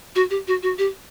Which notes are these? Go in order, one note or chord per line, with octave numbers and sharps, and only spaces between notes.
F#4
G4
F#4
F#4
G4